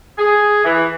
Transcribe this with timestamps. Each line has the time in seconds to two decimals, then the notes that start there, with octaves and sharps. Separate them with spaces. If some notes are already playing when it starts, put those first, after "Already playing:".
0.18 G#4
0.65 E3